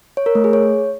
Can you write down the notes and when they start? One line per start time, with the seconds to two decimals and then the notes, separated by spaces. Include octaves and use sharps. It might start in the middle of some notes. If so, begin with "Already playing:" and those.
0.17 C#5
0.26 A#4
0.35 A3
0.44 G#4
0.53 C#5